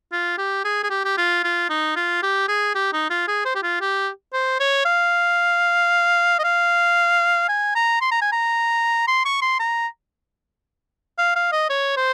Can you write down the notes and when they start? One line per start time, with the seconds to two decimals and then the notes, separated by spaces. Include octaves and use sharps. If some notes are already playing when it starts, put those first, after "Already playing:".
0.12 F4
0.38 G4
0.65 G#4
0.83 G#4
0.90 G4
1.05 G4
1.17 F4
1.44 F4
1.70 D#4
1.96 F4
2.23 G4
2.48 G#4
2.75 G4
2.93 D#4
3.10 F4
3.28 G#4
3.46 C5
3.55 G4
3.63 F4
3.81 G4
4.33 C5
4.60 C#5
4.85 F5
6.39 D#5
6.44 F5
7.49 G#5
7.75 A#5
8.01 C6
8.11 A#5
8.22 G#5
8.32 A#5
9.08 C6
9.25 C#6
9.42 C6
9.60 A#5
11.18 F5
11.36 F5
11.52 D#5
11.70 C#5
11.97 C5